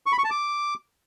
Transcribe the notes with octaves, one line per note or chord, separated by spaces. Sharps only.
C#6
B5
C#6
A5
D6